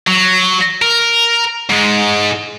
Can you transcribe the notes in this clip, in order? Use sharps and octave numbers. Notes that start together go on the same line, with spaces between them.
F#3
A#4
G#2 G#3